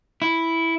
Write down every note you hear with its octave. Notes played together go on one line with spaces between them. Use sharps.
E4